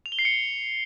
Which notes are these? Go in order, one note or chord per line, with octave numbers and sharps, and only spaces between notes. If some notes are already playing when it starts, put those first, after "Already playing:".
F7
G7
C7
C#7